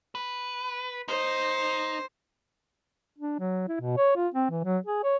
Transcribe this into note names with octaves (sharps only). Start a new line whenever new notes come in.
B4
D#4 C5
D4
F#3
E4
B2
C#5
F4
C4
E3
F#3
G#4
C#5